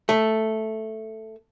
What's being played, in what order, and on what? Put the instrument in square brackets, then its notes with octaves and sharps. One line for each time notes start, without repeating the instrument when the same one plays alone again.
[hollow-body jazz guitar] A3